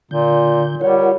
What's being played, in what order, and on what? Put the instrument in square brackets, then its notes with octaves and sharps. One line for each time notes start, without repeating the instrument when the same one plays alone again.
[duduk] A#2 [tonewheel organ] D3 G6
[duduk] G3 [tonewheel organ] F4 A#4 F#5 [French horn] C#5